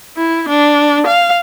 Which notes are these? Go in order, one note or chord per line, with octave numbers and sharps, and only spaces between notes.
E4
D4
F5